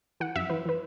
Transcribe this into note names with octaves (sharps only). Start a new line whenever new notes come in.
E3 F#5
F#2 E5
E3 B4
E3 B4